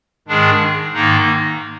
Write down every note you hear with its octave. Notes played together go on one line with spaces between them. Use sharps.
G#2 D#3 G#3 D4 G#4
G#2 D#3 A#3 D#4